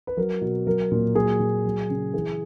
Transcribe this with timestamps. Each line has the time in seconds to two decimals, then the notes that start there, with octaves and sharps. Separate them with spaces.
0.07 B4
0.17 F#3 A#4
0.41 B2
0.67 F#3 A#4
0.92 A#2
1.15 F#3 G#4
1.40 A#2
1.64 F#3
1.89 C#3
2.14 E3 G#4